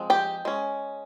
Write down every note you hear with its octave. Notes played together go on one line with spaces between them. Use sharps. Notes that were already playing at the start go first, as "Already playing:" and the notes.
Already playing: F3 G#3 C4
G4 G5
G#3 C#4